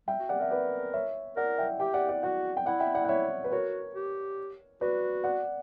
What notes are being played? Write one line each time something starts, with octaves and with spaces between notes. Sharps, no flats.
G3 E5 G5
F#4
G4 D5 F#5
A#4 E5
B4 D5
C#5 E5
A#4 D5 F#5
E5 G5
G4 E5 G5
D5 F#5
D5 F#5
F#4 D5 F#5
G5
E4 D5 F#5
E5 G5
D5 F#5
F#5
C#5 E5
B4
F#4 A#4 C#5
G4
F#4 B4 D5
D5 F#5